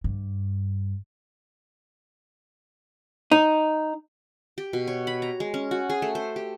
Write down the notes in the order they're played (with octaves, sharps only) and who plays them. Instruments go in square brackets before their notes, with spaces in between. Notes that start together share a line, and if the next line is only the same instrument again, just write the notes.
[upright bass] G2
[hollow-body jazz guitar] D#4
[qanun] G4
B2
C#5
B5
A#5
G#3
C#4
F#4
G#4
A3
C5
G4